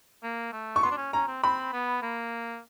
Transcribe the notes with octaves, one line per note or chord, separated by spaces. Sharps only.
A#3
A3
C#6
B3 C6
D4
C#4
C#4 A#5
C4
C4 B5
B3
A#3